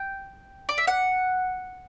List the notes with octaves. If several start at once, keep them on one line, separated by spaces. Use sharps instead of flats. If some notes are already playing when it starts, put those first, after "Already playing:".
Already playing: G5
D5
E5
F#5